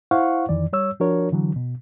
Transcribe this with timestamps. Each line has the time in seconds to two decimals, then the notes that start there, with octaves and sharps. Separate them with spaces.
0.11 E4 C5 F5 F#5 C#6
0.49 F2 D#3 E3 D5
0.73 G3 C#5 E6
1.00 F3 D4 F#4 A#4 C#5
1.32 D3 E3 F#3
1.56 B2